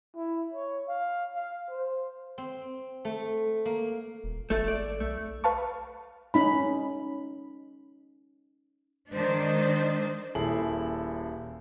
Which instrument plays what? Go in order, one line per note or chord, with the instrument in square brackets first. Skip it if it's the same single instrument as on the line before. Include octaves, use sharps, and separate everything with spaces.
[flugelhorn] E4
C#5
F5
F5
C5
[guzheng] C4
A3
A#3
[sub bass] D#1
[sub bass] G#1 [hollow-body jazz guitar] A3 A4
[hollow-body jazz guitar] D5
[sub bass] B1 [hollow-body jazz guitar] A3
[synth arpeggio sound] B4 F5 A5 C#6
[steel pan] C#4 D#4 B5
[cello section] D#3 G#3 D4 C5 D#5
[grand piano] D#1 C#4 E4 G#4 A4 F#7